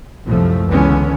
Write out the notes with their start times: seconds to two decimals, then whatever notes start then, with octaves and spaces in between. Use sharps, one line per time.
0.25 C2 F#2 F3 A3
0.69 C#2 D3 E3 G#3 B3 C#4